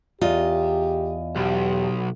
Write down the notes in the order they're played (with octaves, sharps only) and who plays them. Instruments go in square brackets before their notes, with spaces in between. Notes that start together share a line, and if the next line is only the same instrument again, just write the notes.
[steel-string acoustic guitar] E2 F4 D#5 [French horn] G4
[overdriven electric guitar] B1 [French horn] G4